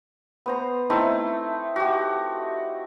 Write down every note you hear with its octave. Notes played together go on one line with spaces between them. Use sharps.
B3 C5 A#5
A3 C4 D#4 E4
F#4 G4